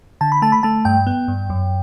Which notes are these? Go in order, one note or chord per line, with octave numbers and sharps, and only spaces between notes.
D3 A5
B5
A3 A5
B5
A3 A5
G2 G5
B3
G2
F#2